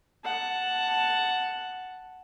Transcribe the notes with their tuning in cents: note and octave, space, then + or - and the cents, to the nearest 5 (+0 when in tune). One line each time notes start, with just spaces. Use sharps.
F#5 +0 A5 +0